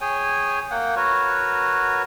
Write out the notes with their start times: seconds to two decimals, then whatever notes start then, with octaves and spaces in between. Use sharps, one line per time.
0.01 G#4 C#5 G5 G#5
0.71 A#3 F#5 G5
0.96 F#4 A#4 B4 C#5